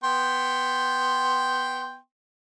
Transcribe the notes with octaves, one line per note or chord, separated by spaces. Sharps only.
B3 G5 C6